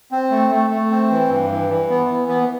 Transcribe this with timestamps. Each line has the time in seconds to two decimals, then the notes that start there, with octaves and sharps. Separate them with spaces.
0.12 C4
0.30 A3
0.50 A3
0.70 A3
0.91 C4
1.11 E3
1.30 G2
1.50 E3
1.69 E3
1.90 B3
2.09 E3
2.28 B3